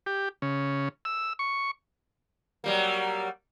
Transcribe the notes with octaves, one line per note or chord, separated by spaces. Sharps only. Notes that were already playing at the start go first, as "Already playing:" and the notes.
G4
C#3
E6
C#6
F#3 G3 A#3